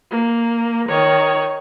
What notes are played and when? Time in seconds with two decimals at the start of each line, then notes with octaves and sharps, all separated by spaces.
0.11 A#3
0.88 D#3 C#5